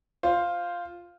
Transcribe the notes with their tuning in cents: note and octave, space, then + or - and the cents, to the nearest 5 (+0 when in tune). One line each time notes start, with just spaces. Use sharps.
F4 +0 C5 +0